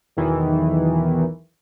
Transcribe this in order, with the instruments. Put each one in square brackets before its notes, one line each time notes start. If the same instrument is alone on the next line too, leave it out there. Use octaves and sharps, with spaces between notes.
[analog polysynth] B1 E2 D#3 E3